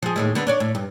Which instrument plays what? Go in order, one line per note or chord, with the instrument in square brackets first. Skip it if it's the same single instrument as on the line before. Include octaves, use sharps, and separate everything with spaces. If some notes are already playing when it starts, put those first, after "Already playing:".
[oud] F3 G#4
D#2 A2 G#3
D3 B3
D4 C#5 D5
A2
G2